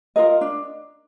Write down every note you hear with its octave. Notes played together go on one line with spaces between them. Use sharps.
F4 A#4 D#5
D4